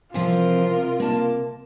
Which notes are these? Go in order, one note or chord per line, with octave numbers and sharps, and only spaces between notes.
C3 E3 F3 C4 F4 A#4
A#3 A5